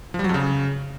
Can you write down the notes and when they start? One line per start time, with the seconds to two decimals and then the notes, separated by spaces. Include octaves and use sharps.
0.14 F3
0.19 G3
0.24 F#3
0.29 F2
0.34 C#3